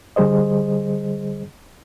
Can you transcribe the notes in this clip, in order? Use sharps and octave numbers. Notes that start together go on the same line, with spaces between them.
D3 G3 G#4 C5 D#5